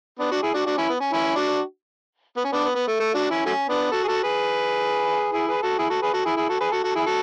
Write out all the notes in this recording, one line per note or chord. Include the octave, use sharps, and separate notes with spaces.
B3 D4
D4 F#4
E4 G#4
D4 F#4
D4 F#4
C#4 E4
B3
C#4
C#4 E4
D4 F#4
B3
C#4
B3 D4
B3
B3
A3
A3
D4 F#4
C#4 E4
F#3 A3 C#4
B3 D4
F#4 A4
G#4
F#4 A4
G#4 B4
E4 G#4
G#4 B4
F#4 A4
E4 G#4
F#4 A4
G#4 B4
F#4 A4
E4 G#4
E4 G#4
F#4 A4
G#4 B4
F#4 A4
F#4 A4
E4 G#4
F#4 A4